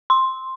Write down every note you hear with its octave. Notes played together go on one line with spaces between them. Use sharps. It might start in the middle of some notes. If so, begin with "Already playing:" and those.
C6